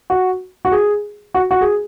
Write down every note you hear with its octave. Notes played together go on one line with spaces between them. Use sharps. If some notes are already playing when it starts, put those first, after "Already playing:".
F#4
F#4
G#4
F#4
F#4
G#4